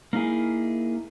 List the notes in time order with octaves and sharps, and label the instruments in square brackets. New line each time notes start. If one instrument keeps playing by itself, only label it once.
[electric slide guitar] A#3 D#4 E4 G#4